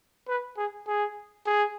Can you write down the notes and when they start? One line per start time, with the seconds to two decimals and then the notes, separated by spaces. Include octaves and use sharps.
0.28 B4
0.57 G#4
0.87 G#4
1.46 G#4